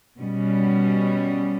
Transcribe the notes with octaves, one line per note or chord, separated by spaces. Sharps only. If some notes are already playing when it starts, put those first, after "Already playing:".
B2 G3 C#4